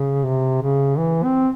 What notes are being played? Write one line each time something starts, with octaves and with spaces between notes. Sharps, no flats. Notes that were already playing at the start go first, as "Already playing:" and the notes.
Already playing: C#3
C3
C#3
E3
C4